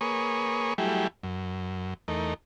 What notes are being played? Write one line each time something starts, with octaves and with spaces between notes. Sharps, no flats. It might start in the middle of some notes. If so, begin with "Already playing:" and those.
A#3 G#4 B4 C#5 C#6 D#6
F#3 G3 A3 E4 G4 G#4
F#2
E2 A3 D#4 A#4